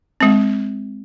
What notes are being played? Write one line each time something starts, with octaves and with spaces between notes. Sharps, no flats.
G#3 C4